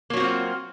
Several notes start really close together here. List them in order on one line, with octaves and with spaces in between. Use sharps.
A#3 F#3 F#4 C4 F4